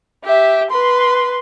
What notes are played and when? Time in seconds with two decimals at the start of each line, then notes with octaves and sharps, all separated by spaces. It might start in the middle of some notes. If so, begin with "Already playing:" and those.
0.25 G4 E5
0.70 B4 C6